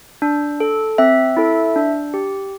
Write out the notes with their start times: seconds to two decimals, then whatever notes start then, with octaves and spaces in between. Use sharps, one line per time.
0.22 D4
0.60 A4
0.98 C4 E5
1.37 E4 A4
1.76 D4
2.14 G4